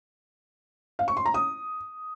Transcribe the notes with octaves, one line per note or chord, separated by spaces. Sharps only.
F5
C#6
C6
A#5
D#6